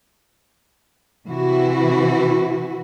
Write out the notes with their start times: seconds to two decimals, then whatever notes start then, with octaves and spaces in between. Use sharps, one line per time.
1.27 C3 E3 E4 F#4